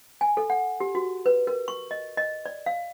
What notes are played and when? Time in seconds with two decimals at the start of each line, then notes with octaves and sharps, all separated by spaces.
0.21 G#5
0.37 A4
0.50 F#5
0.80 G4
0.95 F#4
1.26 B4
1.47 A#4
1.68 C#6
1.91 D#5
2.17 D#5
2.46 D5
2.66 F5